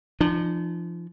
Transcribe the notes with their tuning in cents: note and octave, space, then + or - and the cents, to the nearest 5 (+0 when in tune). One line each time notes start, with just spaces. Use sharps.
F3 -30 D4 +45